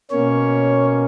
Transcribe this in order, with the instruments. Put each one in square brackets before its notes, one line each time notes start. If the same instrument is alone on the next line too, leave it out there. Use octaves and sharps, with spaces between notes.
[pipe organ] B2 A#3 C#4 C#5